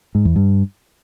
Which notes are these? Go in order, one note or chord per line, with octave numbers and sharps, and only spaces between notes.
G#2
E2
G2